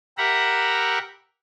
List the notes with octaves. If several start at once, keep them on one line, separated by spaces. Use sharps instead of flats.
G4 A#4 E5 F#5 A#5 B5